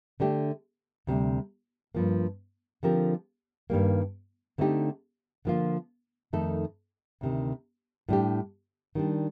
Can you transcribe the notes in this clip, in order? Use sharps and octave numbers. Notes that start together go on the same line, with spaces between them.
D3 A3 D4 G4
D2 C3 G3
G2 F3 A#3
D3 F3 C4 G4 A#4
G2 D#3 G3 A#3
D3 A3 C4 D#4 G4
D3 F3 A#3 F4
F2 D#3 A3 D#4 A4
D2 C3 D#3
A2 G3 D4 G4
D#3 G3 D4